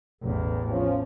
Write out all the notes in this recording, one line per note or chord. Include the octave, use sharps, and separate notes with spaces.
A1 E2
F3 C#4